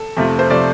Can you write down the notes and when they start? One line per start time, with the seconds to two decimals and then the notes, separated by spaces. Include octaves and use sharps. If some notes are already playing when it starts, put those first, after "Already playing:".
Already playing: A4
0.17 F2 C3 F3 A3
0.39 C5
0.50 C3 F3 A3 D5